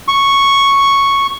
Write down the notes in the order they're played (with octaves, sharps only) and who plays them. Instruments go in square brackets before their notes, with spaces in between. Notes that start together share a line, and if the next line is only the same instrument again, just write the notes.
[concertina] C#6